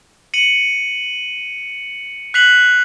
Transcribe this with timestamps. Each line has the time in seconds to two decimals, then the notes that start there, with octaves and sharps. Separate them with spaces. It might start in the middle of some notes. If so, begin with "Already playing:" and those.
0.34 C#7 D#7 F#7
2.34 F#6 B6 C7 F7 F#7